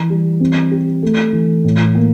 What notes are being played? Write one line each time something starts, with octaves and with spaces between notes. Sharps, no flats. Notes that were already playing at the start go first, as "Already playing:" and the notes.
Already playing: E3
G3
C4
G4
A3
E3
A2
A#3